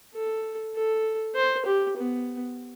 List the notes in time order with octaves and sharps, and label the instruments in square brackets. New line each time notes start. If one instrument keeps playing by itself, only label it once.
[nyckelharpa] A4
A4
C5
G4
B3